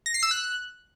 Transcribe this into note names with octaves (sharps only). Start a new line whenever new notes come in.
A#6
C7
E6
F#6